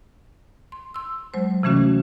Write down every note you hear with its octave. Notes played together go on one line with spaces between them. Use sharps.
C6
C6 E6
F#3 G#3 C5
C3 E3 A3 C#4 F#4